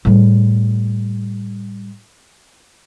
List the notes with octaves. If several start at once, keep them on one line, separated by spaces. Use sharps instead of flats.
A2 G3